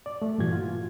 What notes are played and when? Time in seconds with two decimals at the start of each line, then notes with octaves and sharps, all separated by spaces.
0.06 D5
0.22 A3
0.38 G2 A#2 E3 F#4 G#6
0.53 F4